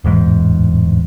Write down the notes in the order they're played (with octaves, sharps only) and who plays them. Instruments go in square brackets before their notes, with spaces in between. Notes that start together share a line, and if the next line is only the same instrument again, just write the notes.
[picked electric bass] D1 E2 G#2